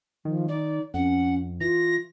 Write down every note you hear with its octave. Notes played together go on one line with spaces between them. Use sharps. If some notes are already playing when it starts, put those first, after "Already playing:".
D#3 F3
D#4 D5
F2 C#4 F#5
E3 F4 A#6